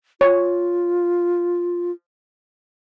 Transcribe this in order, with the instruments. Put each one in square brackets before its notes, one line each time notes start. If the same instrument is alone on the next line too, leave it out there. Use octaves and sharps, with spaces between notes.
[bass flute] F4 [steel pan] C#5